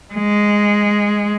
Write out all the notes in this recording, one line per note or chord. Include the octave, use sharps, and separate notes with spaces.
G#3